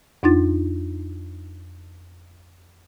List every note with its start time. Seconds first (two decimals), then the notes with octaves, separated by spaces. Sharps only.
0.23 F2 D4 D#4 F4 A6